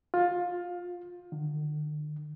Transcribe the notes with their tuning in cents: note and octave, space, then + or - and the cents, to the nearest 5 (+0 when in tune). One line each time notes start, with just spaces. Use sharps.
F4 +20
D3 +45